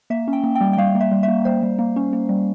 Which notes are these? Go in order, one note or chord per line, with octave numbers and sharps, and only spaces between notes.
A#3 E5
C#4
G5
A#3
G5
G3
G5
G3 F5
A#3
E5
G3
E5
A#3
G3 C5
G3
A#3
C#4
A#3
G3